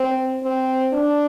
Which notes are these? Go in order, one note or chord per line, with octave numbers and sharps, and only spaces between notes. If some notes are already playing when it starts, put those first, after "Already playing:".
Already playing: C4
C4
D4